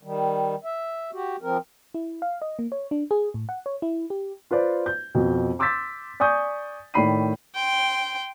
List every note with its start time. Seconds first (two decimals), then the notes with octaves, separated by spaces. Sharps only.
0.03 D#3 G3
0.64 E5
1.13 F#4 G4
1.42 F3 C4 A#4
1.94 E4
2.22 F5
2.42 D#5
2.59 A#3
2.72 C#5
2.91 D4
3.11 G#4
3.34 A2
3.49 F#5
3.66 C#5
3.82 E4
4.10 G4
4.51 F4 B4 C5 D5
4.86 G6
5.15 F2 B2
5.59 C6 D6 E6 G6 A6 B6
6.20 D5 G#5 C#6 D#6 G6
6.94 A2 D#3 D5 B5 C7 D#7
7.55 G5 C6